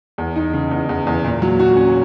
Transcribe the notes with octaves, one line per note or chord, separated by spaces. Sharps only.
E2
D#4
C#3
E2
E2
E2
A#2
F#3
F#4
C#4